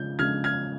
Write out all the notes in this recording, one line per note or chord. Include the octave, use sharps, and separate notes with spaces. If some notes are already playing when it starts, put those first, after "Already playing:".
Already playing: C#3 F3 G#3 G6
C#3 F3 G#3 F6 G#6
F6 G#6